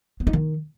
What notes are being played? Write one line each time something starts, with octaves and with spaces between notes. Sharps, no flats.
B3
D#4
D#3